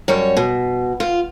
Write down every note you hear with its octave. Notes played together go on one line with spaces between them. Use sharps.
F#2 G3 C#5
B2
F4